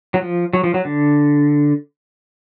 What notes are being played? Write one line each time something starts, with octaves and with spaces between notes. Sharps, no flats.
F#3
F3
F#3
F3
F#3
D3